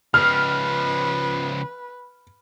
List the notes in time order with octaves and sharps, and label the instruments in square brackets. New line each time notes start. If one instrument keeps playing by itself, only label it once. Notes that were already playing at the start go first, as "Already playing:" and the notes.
[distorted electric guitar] C#2 F3 [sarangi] B4 [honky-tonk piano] F6